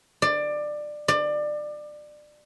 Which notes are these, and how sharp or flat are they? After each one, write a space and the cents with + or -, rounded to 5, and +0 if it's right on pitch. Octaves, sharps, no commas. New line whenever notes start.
D5 +20
D5 +25